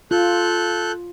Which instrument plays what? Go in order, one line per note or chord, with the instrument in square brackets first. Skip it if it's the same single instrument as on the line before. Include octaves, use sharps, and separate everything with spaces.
[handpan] F4 [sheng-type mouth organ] A4 F#6 G6